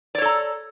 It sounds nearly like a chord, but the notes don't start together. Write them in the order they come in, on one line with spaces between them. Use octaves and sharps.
D5 C#5 A4 A#5